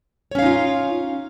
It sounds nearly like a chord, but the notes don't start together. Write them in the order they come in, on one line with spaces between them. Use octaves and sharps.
C#5 C#4 F5 D#4 F4